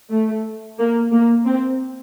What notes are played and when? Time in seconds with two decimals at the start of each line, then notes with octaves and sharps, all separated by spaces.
0.10 A3
0.79 A#3
1.12 A#3
1.46 C4